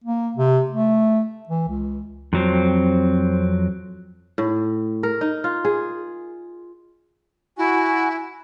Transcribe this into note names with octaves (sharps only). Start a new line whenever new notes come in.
A#3
C3
A3
E3
C#2
F2 F#3 C4
A2
A#4
D#4
F4
G#4
E4 F#4 G#5